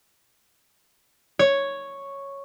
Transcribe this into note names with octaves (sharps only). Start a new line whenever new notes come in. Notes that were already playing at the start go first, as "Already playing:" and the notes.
C#5